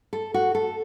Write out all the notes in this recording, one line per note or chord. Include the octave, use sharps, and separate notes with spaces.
A4
F#4
A4